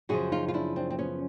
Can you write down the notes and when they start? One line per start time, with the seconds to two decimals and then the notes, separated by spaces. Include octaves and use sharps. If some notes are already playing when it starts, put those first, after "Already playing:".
0.09 F#2 C#3 F3 F#4 G#4
0.32 D#4 F4
0.48 F4
0.54 D4 E4
0.76 C4 D4
0.91 C4
0.99 B3 C#4